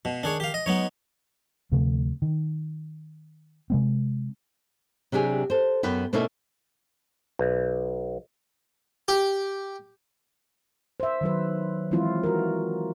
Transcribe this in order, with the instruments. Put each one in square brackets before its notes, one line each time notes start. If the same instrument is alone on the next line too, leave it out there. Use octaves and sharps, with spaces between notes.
[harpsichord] B2 [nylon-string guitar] F5
[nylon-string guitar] D#3 [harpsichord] D4 G#4 C#5
[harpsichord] G4 F5
D#5
[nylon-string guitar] F#3 G#3 [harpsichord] B3 D#4 C#5
[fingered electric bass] D2 C3 F3 A3
D#3
C3 G#3 C4
[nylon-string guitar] C3 F#3 D4 G4 G#4
A4 C5
F#2 B3 B4 G5
B2 A3 A#3 C#4 D#4 E4
[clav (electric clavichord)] B1
[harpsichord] G4
[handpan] C5 E5
D#3 F#3 B4
E3 F3 G#3 C4 E4 F4
F#4 A#4